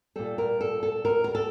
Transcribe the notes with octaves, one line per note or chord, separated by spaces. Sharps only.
A#2 G3 A4
A#4
A4
A4
A#4
A#4
A4